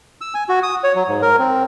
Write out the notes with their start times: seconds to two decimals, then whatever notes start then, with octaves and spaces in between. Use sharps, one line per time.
0.21 E6
0.34 G#5
0.49 F#4
0.63 D#6
0.84 C#5
0.95 F#3
1.08 G#2
1.22 A#4
1.39 C4